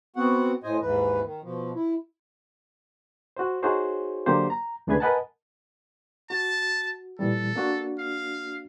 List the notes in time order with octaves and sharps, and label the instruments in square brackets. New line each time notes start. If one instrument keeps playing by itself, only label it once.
[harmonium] B3 C4 F#4 F#5
A2 C5 D#5 G#5
D#2 G#2 E3 B4
D#3
B2 F3
E4
[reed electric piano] F#4 C5
D#4 F#4 G#4 C5 C#5
D3 F#3 A#3 G4 C5
A#5
C#2 D3 A3 G#4 B4 G#6
A#4 B4 D#5 F#5 G#5 A5
[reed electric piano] F#4 [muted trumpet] A5
[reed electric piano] A#2 E3 G3 [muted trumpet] A4
[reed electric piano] A#3 D4 F#4
[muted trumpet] F5